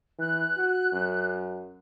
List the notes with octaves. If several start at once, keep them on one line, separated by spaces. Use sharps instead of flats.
E3 F#6
F#4
F#2